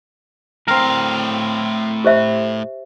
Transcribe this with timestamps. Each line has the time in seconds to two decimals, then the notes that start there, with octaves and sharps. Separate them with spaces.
0.68 A2 C4 A#4 F5
2.05 G4 C5 E5